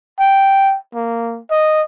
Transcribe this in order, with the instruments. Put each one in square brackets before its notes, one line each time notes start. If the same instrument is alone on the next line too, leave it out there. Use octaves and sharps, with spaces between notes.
[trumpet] G5
A#3
D#5